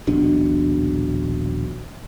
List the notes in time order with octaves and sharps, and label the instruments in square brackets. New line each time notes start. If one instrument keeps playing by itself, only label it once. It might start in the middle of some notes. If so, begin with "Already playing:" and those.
[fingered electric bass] D#1 A#1 B2 D4